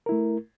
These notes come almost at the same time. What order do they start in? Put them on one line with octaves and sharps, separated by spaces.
A#4 E4 A3